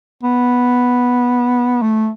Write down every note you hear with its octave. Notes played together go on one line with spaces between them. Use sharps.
B3
A3